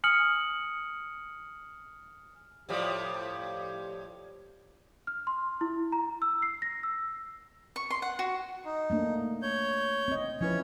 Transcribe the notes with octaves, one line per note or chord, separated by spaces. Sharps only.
G#5 D#6 F6 C#7 F#7
A2 F3 G3 G4
F6
C6
E4
A#5
E6
C7
A#6
E6
C#6
C6
F#5
F#4
D#4
A3 A#3 D4
C#5 G6
C4 D#5
F3 C#4 E4 B4 C#5